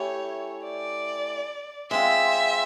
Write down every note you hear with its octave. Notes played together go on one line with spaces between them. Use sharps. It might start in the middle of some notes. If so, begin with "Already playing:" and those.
Already playing: A3 C#4 E4 G4 C#5
D5
G#3 C4 F4 E5